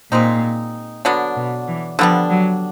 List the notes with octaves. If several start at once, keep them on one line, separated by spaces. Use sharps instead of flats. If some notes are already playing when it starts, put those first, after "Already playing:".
A#2 G#3 C4 D#4
D3 F#3 B3 D4
B2
E3
D3 F3 G3 B3 D4
F#3